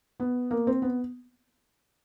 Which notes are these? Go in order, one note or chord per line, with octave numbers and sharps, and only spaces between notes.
B3
A#3
C4
B3